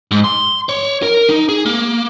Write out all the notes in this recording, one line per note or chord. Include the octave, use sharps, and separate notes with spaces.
G#2
C6
C#5
A#4
D#4
G#4
A#3